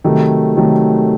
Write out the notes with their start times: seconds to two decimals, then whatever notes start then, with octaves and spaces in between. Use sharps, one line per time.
0.04 C3 D#3 F#3 A3
0.56 C3 D#3 F#3 A3